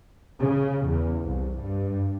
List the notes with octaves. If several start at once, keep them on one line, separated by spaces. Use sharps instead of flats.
C#3
E2
C2
G2